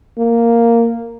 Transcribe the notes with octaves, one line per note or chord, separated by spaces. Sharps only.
A#3